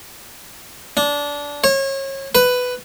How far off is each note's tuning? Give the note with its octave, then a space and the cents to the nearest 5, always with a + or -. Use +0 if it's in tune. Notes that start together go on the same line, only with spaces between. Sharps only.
D4 -20
C#5 -30
B4 +10